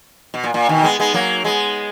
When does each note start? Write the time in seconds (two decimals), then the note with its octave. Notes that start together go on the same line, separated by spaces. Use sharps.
0.34 B2
0.44 A#2
0.54 A#2
0.69 B2 D#3
0.83 G#3 B3
1.00 G#3 B3
1.14 F#3 A#3
1.44 G#3 B3